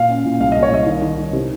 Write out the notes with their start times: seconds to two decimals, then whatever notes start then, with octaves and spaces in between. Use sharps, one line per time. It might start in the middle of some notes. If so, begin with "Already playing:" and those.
Already playing: A#2 F5
0.09 C#4
0.25 A#2
0.40 C2 F5
0.52 C2 D#5
0.63 C#5
0.72 C2 D#5
0.87 D#3
1.02 D#3
1.18 D#3
1.33 C3